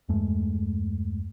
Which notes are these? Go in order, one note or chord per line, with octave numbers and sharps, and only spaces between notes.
E2 G2 G#3 A3